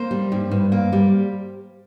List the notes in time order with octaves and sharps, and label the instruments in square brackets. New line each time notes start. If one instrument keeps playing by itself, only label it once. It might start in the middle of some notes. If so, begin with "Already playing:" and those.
Already playing: [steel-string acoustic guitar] A#3 C5
G3
G2
G2
A#3
G3